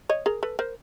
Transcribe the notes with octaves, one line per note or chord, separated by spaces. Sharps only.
C#5 D#5
G#4 A#4
A4 B4
A#4 C5